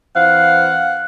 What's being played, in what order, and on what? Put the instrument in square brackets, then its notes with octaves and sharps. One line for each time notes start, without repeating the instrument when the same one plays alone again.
[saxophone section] E3 C4 F5 [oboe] F#5